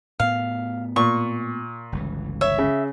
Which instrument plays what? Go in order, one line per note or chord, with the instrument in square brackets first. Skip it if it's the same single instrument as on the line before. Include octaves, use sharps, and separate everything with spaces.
[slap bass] A2 B3 [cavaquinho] F5
[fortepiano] A#2 [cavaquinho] C#6
[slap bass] G1 C#2 E3
[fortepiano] C#5 [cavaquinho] E5
[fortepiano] C#3